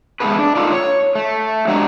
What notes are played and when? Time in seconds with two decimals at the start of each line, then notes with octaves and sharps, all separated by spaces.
0.20 G#3 A3 B3 G#4 A4 B4
0.39 D4
0.55 D4 D#4 F4 G4 A4 A#4
0.72 C#5
1.15 A3
1.68 F#3 G#3 D4 G4 F#5 A#5